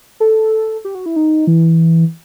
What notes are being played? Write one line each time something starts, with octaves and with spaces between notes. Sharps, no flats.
A4
G4
F#4
E4
D#4
E3